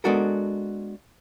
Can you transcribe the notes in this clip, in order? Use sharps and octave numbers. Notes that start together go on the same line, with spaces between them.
G#3 B3 D4 F#4 A4 A#4